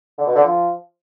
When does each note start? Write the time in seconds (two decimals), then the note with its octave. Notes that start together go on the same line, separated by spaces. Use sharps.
0.18 D3
0.27 B2
0.35 D3
0.44 F3